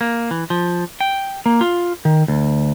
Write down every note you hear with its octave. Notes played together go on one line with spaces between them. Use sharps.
A#3
E3
F3
G5
A#3
F4
D#3
D2